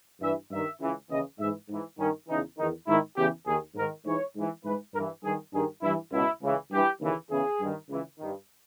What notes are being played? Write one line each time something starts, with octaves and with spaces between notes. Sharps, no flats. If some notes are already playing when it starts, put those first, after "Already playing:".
G2 E3 E5
G2 D#3 E5
C#2 C#3 E3
D#2 C#3 E3 D#5
G#2 E3 E5
G#2 E3
G2 D#3 C#4
E2 C#3 E3 D#4
E2 D#3 D#4
G#2 D#3 E4
E2 C#3 E3 G4
D#2 D#3 G#4
G#2 D#3 A#4
G#2 E3 C#5
G#2 E3
G#2 E3 B4
G2 E3 A#4
G2 D#3 G#4
G2 D#3 G#4
G2 E3 E4
C#2 B2 E4
C#2 C#3 E3
G2 E3 G4
D#2 C#3 E3
E2 C#3 E3 G#4
G2 D#3
C#2 C#3 E3
G2 D#3